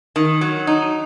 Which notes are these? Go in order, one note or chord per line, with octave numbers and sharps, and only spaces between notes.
D#3
F#3
D#4